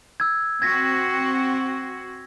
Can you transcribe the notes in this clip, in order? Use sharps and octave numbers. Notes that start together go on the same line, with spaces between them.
E6 G#6
C4 F#4 G#6 A#6 B6